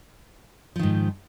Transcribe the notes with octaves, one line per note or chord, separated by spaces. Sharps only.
G#2 D#3 F3